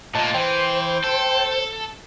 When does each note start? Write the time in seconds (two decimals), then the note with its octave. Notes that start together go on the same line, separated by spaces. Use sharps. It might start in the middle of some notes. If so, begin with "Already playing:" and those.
0.15 A#2 A3 A#3 D#5 A5
0.34 E3 C5 G5
1.04 A4